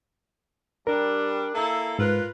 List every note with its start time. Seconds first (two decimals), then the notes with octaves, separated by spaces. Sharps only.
0.87 G3 D4 A#4
1.54 A#3 E4 A4
1.99 G#2 F4 A#4 B4